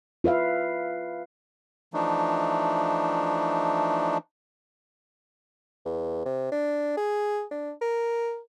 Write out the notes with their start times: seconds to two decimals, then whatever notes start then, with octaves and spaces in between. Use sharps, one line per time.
0.24 F4 B4 E5 F5
1.94 E3 F3 A3 D4 D#4
5.85 E2
6.25 C3
6.52 D4
6.97 G#4
7.51 D4
7.81 A#4